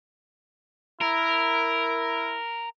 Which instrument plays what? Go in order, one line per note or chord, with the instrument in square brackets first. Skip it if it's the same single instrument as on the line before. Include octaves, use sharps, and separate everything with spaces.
[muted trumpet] E4 [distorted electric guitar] A#4